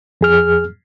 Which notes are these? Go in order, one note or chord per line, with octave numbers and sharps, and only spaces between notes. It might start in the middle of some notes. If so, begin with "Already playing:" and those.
F2 G#4 F6